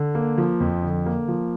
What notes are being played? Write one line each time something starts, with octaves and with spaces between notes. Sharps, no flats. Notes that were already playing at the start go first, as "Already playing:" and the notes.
Already playing: D3
A#3
F3
F2
D3
A#3
F3